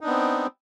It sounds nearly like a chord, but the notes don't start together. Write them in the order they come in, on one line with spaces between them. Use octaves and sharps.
D#4 D4 B3 C4